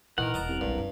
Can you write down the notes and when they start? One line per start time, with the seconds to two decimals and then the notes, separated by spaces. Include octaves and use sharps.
0.18 A#2 D#3 E3 A#4 F#5
0.34 E1 F4 D#5 A5 A#5
0.48 C2
0.61 A#1 G2 G#3
0.73 F#2 D#4